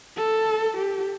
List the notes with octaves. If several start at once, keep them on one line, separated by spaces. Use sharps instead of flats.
A4
G4